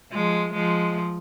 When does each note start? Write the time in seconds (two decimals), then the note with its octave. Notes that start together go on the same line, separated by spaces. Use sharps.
0.12 F3 G#3
0.53 F3 G#3